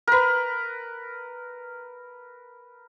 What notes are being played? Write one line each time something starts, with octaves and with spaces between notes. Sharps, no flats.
A#4 B4